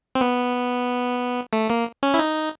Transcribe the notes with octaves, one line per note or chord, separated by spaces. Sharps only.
C4
B3
A3
A#3
C#4
E4
D#4